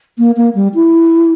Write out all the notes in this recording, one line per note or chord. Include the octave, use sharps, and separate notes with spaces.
A#3
A#3
G3
E4